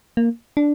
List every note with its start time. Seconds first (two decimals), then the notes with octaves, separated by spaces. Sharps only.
0.17 A#3
0.57 D4